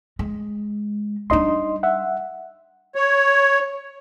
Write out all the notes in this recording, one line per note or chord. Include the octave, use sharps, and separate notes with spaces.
G#3
G3 D4 D#4 D#5 C6
E5 F#5
C#5